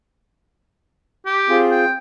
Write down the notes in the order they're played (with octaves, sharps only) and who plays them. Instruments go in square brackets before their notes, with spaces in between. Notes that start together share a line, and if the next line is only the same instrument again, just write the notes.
[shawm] G4
[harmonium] C4 F4 G#4
[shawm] G5